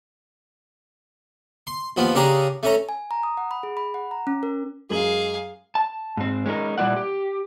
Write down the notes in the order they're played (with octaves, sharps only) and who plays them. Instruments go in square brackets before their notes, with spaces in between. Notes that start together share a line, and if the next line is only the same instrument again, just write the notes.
[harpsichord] C6
D#2 F3 B3 F4
C#3 C#4 D4 G4 G#4 A#5
A3 C#4 A#5
[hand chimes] G#5
A#5
D#6
F#5
B5
G#4
B5
F#5
A#5
C#4
A#4
[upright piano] F#2 G#3 F#7 [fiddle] G#4 F5
[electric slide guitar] A5
G#2 C4
G#3 C#4 D#4 G#4 A#4
A#2 G3 C4 E4 D5 F#5
G4